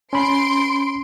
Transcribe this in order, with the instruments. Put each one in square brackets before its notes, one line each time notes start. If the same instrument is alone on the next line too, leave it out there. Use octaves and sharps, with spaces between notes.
[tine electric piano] C#4 B5 [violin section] C6 D7